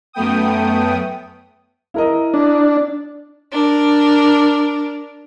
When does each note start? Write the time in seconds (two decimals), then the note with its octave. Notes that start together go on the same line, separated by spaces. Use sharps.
0.13 F#2 A3 B3 G5 D#6
1.94 E4 A#4 D#5
2.34 D4
3.52 D4 A#4